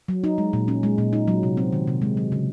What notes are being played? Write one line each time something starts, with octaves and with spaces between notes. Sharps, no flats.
F#3
D#4
G#3
A#2
C#4
G#3
A#2
D#4
F#3
C3
C4
D#3
C3
G#3
F#3
C#3